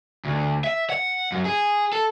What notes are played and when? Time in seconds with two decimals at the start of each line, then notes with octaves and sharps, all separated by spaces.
0.25 D2
0.64 E5
0.90 F#5
1.32 F#2
1.45 G#4
1.93 A4